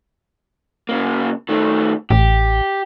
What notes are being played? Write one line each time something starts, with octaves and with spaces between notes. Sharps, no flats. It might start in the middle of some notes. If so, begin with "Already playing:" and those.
C#3 A#3
D#3 A3
A1 G4